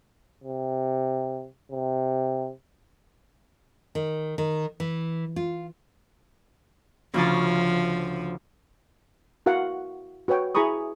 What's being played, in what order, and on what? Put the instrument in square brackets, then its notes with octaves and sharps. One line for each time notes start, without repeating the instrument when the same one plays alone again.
[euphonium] C3
C3
[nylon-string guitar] D#3
D#3
E3
F4
[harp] D2 C#3 A5 [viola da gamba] F3
[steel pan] E4 F#4 A#4 F5 F#5
F#4 B4 C#5 G5
E4 G#4 A#5 B5 C#6 D#6